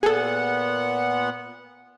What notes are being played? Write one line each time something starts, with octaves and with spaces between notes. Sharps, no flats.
A#2 B3 G#4 A4 F#5